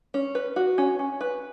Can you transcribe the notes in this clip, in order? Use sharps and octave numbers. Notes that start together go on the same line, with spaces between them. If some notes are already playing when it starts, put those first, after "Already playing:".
C#4
B4
F#4
C#4
C#4
B4